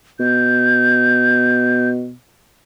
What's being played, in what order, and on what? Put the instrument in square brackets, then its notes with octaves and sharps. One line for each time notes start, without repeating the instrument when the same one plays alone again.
[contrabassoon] B2 [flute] G6